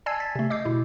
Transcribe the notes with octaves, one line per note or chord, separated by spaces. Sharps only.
D5 G#5 A5 E6 G#6 C7
G#6 A6 B6
C3 A3
D#5 D6 E6 G6 C7
B2 E4